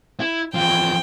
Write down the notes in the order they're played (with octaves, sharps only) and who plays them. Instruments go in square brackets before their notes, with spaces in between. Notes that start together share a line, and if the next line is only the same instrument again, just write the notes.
[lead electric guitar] E4
[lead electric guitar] E2 F3 [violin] G5